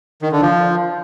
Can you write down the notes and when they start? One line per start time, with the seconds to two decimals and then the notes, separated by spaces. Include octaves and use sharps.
0.22 D#3
0.32 D3
0.42 F3